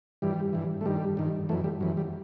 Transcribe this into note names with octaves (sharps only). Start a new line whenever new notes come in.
G2 E3 G3
G2 E3
A3
G2 D#3 G3
G2 D#3
F#2 E3 A3
G3
F#2 E3
G3